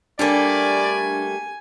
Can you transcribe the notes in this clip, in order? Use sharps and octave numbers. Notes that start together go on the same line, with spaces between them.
G3 A3 A#3 D4 D5 G#5